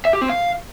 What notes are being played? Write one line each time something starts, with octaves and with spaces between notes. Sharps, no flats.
E5
G4
C4
F5